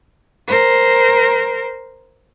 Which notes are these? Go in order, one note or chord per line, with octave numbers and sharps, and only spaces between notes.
A#4 C5